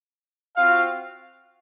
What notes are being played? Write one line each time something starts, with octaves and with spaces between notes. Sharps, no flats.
C4 F4 F#4 F5